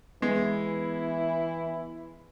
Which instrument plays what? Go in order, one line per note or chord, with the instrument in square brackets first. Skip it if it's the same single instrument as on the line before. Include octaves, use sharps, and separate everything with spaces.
[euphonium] E3 [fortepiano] G#3 [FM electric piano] B3 [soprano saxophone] E4